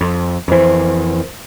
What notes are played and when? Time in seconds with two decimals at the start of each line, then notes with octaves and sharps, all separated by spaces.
0.01 F2
0.48 F2 E3 A#4 C5